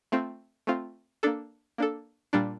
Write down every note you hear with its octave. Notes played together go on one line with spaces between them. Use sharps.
A3 C4 F4
A3 C4 F4
A#3 D4 A4
A#3 D4 A4
A#2 G3 D4